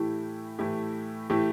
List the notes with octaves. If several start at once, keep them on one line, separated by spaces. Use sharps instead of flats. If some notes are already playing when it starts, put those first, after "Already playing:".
Already playing: A2 E3 A3 E4 G4
A2 E3 A3 E4 G4
A2 E3 A3 E4 G4